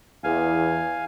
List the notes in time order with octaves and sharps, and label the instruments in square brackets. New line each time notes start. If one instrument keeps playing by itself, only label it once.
[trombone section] E2 [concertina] F5 G#5